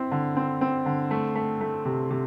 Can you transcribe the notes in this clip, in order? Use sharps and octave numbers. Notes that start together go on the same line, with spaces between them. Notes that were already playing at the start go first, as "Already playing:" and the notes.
Already playing: C4 E4
D3
C4
C4
D3
A3
A3
A3
C3
C3